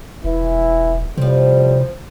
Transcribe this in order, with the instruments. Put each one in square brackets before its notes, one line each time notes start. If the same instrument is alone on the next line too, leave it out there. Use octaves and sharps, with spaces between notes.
[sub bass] E1 [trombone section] E3 E4
[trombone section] F2 A2 G3 [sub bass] C3 [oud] F3 C4